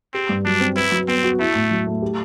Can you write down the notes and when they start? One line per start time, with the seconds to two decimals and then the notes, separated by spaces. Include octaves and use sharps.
0.14 C4 G4
0.29 G2
0.45 F#3 D4
0.60 C4
0.76 E4 B4
0.92 F#3
1.08 B3 C4
1.23 F#4
1.39 A3 E4
1.55 A2
1.71 F#3
1.87 A3
2.02 G4